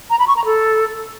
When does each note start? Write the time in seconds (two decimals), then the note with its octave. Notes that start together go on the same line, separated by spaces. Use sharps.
0.10 A#5
0.19 B5
0.28 C#6
0.37 A#5
0.45 A4